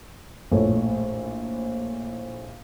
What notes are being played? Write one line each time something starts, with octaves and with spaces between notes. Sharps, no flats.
A#1 A2 A4 C#5